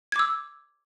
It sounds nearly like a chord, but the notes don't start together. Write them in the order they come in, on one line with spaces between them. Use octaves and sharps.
G#6 D6 E6